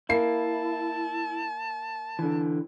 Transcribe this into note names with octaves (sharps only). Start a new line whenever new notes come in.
A#3 E4 A5 C7
D3 E3